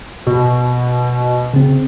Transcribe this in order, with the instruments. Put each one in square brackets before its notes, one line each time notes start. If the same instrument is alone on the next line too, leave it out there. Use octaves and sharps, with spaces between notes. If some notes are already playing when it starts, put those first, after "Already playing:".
[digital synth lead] B2
[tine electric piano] C#3 C4